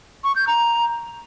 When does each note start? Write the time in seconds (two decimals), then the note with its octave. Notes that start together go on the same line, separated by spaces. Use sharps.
0.24 C#6
0.36 G6
0.47 A#5